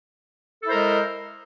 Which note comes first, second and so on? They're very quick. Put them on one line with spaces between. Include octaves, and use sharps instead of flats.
A4 E4 C5 A#4 G#3